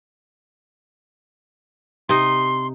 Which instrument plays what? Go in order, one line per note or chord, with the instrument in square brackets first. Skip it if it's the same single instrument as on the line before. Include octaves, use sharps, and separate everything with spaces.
[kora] C3 D#4 D#5 [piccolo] C6